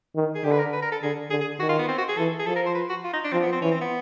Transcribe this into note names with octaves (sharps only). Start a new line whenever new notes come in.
D#3
G#4
D3 G4
B4
A#4
B4
A#4
A4
D3 G#4
D3 G#4
G#4
D#3 F#4
F4
B3
C4
F#4
G#4
E3 A4
G#4
F3 A4
A#4
C5
B4
F#4
F4
D#4
D4
F3 C4
B3
C4
E3 C#4
C4
B3